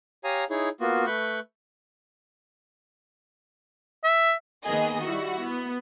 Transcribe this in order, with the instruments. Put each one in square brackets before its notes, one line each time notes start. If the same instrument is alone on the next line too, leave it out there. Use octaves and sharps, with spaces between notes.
[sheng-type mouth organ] G4 C#5 F5 G#5 A#5 D#6
D#4 E4 G#4 C#5
A#3 B3 F4 F#4
A3 B4 B5 C#6 G6
[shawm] E5
[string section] D#3 A#3 B3 G#4 D#5
G3 E4 F#4
B3